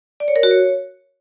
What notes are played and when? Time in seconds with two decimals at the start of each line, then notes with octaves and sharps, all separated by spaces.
0.20 D5
0.28 C#5
0.36 A#4
0.43 F#4
0.51 C#5